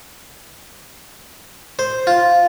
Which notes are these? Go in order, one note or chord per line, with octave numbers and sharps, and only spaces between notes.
C5
F4